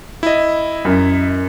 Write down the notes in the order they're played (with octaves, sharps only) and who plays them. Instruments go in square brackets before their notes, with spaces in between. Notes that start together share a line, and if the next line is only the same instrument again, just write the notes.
[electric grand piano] E4 D#5
[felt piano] F#2